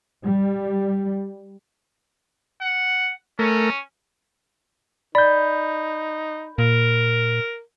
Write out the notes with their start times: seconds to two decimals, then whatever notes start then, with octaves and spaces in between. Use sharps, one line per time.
0.24 G3
2.61 F#5
3.39 A3 C#4 A#4
5.15 D#4 D5 B5 G6
6.58 A#2 A#4